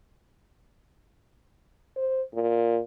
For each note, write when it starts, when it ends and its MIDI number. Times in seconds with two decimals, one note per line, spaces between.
1.96 2.22 72
2.34 2.80 46